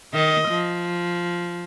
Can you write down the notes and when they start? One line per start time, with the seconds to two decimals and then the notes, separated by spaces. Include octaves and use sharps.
0.14 D#3 D#5
0.48 F3